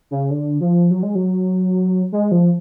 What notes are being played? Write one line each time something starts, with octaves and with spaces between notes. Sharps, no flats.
C#3
D3
F3
F#3
G#3
F#3
G#3
F3